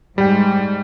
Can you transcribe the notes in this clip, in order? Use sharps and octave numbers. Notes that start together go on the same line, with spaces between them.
G#2 G3 G5